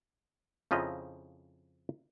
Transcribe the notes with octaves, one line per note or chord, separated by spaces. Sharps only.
F2 C#3 F3 E4 D#5 A#5